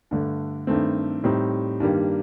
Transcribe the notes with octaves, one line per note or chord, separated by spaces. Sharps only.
G2 D3 A3
G2 D#3 A3 C4
A2 G3 C4 D#4
G2 D#3 G3 A#3